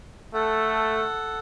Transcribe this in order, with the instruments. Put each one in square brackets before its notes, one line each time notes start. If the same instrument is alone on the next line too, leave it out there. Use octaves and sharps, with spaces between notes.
[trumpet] A3 [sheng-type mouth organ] A4 F#5